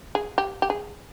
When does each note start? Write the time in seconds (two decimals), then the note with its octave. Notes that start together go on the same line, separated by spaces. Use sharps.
0.15 G#4
0.38 G4
0.62 G4
0.70 G#4